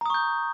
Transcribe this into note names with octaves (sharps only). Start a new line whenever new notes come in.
A#5 C#6 D#6 G6